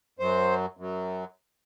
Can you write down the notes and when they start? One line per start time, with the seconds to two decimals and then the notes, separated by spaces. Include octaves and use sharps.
0.19 F#2 F#3 C5
0.77 F#2 F#3